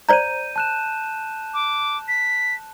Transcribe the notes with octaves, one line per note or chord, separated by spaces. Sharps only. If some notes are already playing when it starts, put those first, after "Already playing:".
C5 D5 A#5 G6 D#7
A5 F#6 E7
D6
B6